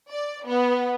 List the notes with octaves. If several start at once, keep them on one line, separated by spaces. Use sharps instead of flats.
D5
B3